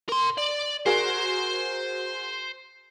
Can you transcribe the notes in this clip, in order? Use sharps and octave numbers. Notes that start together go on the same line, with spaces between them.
A#4 C6
D5
F#4 G#4 A#4 C5